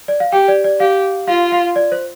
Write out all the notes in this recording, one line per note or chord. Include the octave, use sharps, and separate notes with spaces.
D5
F5
G4 G5
D5
D5
G4 F5
F4 F5
F5
D5
C5